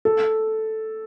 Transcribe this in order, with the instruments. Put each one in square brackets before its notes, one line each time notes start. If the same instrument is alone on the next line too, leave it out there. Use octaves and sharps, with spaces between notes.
[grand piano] A4